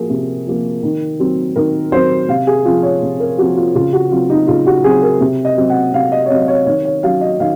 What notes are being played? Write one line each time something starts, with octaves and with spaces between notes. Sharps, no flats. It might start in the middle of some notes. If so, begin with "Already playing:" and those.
Already playing: F3 A#3 F#4 G#4 A#4
C3
F3 A#3
D#3
F#3 C4
D#3 A#4
F#3 C4 C5
C3 F5
G#4
F3 C4 F4
C#5
C3
A#4
F3 C4 F#4
F4
C#3 F4
F#4
F#3 C4 F4
D#4
C#3 F4
F#4
F#3 C4 G#4
A#4
C3
D#5
F#3 C4
F#5
C3 F5
D#5
C#5
F#3 C4 D#5
C#5
D#3 C#5
C#5
F#3 C#4 F5
D#5
D#3 F5